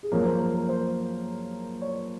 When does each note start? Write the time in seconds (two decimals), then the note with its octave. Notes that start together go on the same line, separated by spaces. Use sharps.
0.03 G#4
0.12 F#2 F3 A#3 C#4 A#4
0.26 C5
0.40 A#4
0.55 A#4
0.69 C5
1.82 C#5